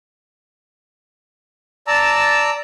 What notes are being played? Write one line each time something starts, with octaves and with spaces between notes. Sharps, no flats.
D5 A5 A#5 E6